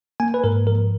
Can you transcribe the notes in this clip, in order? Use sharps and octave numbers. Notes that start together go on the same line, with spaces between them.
A#3 G#5
B4
G#2 A#4
F3 A#4